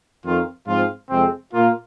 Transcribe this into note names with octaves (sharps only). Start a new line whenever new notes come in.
F2 D#3 C4 F4
G#2 F3 C4 F4
F2 C3 G#3 C4
A#2 A#3 F4